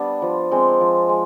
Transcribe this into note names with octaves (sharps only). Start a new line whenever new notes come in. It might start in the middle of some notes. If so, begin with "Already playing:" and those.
Already playing: G3 B3 D4
F3
G#3 C4
F3
G#3